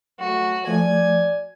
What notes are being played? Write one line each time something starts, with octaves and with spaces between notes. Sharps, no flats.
F#3 A3 F#4
F3 A3 D5 G#5